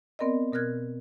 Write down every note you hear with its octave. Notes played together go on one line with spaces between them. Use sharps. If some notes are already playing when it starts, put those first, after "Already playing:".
B3 C4 A#4 D5 D#5
B2 A#4 F6 F#6 G#6